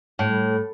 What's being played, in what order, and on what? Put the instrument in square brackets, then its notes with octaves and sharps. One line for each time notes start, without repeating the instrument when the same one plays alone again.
[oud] A2